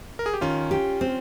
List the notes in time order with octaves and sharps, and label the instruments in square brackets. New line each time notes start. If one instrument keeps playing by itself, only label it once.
[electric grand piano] A#4
G#4
G4
[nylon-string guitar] D#3 [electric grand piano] C#4 F4
[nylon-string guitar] G4
C4